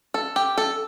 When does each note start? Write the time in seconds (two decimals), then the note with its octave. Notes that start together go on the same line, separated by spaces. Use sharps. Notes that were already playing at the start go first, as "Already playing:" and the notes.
0.14 A4
0.36 G4
0.58 A4